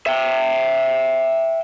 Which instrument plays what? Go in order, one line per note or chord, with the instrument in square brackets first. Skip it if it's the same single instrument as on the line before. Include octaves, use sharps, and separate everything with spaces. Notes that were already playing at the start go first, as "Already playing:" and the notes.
[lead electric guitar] E5 G5